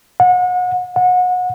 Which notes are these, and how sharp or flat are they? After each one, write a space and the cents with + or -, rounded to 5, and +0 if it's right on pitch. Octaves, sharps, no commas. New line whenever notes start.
F#5 -35
F#5 -30